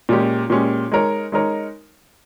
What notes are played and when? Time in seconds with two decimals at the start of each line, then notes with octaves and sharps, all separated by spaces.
0.09 A#2 G#3 C#4 G4
0.50 A#2 G#3 C#4 G4
0.92 G#3 D#4 A#4 C#5
1.32 G#3 D#4 A#4 C#5